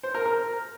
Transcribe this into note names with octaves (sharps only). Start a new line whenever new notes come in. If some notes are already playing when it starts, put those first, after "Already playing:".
C5
A#4
A#4